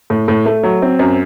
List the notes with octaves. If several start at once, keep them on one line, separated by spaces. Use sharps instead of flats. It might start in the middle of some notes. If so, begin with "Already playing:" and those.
A2
A2
A3
F#3
C4
F#2